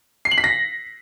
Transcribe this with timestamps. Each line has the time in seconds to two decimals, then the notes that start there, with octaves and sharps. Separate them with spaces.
0.25 C7
0.31 F#7
0.38 B6
0.44 A#6